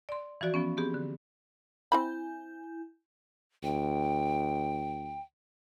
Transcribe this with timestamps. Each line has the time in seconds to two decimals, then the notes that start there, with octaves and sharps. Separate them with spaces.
0.09 D5 C6
0.41 E3 F3 F#4 D5
0.54 F3 B3 C#4
0.77 B3 C4 G4 G#4
0.94 D3
1.92 C4 E4 C5 G#5 B5 G6
3.64 D2 G5